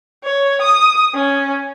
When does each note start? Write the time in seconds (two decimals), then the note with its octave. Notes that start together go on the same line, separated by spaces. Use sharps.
0.24 C#5
0.61 D#6
1.14 C#4